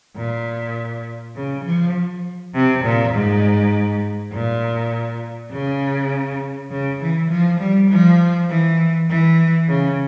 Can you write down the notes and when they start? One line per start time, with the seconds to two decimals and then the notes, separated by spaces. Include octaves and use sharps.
0.16 A#2
1.36 C#3
1.65 F3
2.54 C3
2.84 A#2
3.13 G#2
4.33 A#2
5.52 C#3
6.71 C#3
7.00 E3
7.30 F3
7.60 G3
7.90 F3
8.49 E3
9.09 E3
9.69 C#3